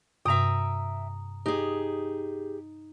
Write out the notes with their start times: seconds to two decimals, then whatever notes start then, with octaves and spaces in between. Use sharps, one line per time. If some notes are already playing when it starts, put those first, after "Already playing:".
0.25 G2 C3 E5 G5 A#5 D#6
1.46 D#4 G4 G#4